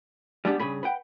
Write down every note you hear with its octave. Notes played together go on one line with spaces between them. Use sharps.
G3 G#3 B3 D4 D#4 G4
G2 C#3 G#4 B5
B4 F#5 G5